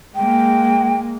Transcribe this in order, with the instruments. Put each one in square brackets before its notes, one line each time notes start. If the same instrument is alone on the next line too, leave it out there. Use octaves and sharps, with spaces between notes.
[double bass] G#3 A#3 [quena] G5